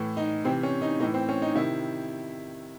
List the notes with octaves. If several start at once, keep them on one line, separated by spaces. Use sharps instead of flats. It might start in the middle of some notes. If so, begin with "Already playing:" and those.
Already playing: A2 E3
D#4
C3 E3 C4
C#4
D#4
A2 E3 D#4
C4
C#4
D#4
C3 D#3 E4